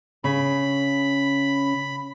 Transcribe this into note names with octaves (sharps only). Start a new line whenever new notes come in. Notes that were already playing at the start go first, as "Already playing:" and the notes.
C#3 B5